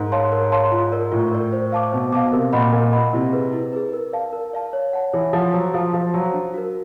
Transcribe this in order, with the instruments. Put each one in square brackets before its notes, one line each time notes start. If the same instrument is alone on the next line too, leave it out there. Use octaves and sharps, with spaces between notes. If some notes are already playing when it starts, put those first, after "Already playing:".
Already playing: [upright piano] G#2 [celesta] A#4
[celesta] C#5 F5 A5 C6
A#4
C#5 F5 A5 C6
F4
A#4 D5
[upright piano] A2 [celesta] F4
[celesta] A#4 D5
C5
F5 A5 D6
[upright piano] B2 [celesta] C5
[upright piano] B2 [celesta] F5 A5 D6
[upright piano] C3 [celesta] A#4
[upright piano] A#2 [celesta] D#5 F#5 B5
[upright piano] A#2 [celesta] A#4
[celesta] D#5 F#5 B5
[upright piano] C3 [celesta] E4
[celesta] G#4 B4
E4
G#4 B4
A#4
D5 F5 A5
A#4
D5 F5 A5
C#5
F#5 A5
[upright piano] E3 [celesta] C#5
[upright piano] F3 [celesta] F#5 A5
[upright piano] F#3 [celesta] C5
[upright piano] F3 [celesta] F5 A5
[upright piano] F3 [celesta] C5
[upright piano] F#3 [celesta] F5 A5
[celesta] D4
F#4 A#4